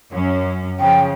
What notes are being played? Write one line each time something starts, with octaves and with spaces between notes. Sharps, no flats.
F#2 C#4
C#3 F3 G5